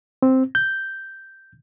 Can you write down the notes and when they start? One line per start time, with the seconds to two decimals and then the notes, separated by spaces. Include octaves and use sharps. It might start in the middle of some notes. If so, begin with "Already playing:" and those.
0.22 C4
0.55 G6